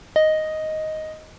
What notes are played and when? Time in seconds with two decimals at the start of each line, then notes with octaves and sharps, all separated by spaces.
0.16 D#5